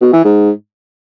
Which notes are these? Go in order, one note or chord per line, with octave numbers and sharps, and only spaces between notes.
B2
E3
G#2